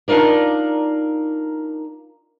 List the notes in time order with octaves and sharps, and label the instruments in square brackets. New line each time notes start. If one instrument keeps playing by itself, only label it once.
[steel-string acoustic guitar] D4 D#4 F4 A#4 D5